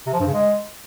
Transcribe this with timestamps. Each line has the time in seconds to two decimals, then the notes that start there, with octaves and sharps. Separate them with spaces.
0.07 C3
0.13 F3
0.20 G2
0.27 C#3
0.34 G#3